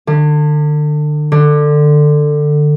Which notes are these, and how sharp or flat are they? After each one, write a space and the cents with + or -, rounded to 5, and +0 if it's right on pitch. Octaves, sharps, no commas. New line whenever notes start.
D3 +35
D3 +20